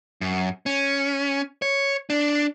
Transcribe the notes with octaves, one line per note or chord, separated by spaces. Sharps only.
F#2
C#4
C#5
D4